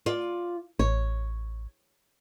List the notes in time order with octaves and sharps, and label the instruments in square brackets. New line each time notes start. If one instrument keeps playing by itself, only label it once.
[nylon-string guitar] F4 D5
[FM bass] A1 [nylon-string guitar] C#5